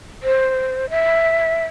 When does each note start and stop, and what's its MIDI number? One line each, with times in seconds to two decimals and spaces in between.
0.23 0.90 72
0.90 1.66 76